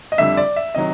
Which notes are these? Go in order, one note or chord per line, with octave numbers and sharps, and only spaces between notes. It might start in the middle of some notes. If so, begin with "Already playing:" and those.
D#5
F2 D3 G3 E5
D5
E5
C3 D#3 F#3 D#5